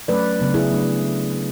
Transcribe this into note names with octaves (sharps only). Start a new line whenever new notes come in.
F#3 A3 C#4 B4 D5
C#3 F#3 B3 D4
E4 G#4
F#3 A3 D4